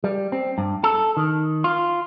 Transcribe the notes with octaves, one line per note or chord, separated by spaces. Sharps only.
G3
C4
G2
A4
D#3
F4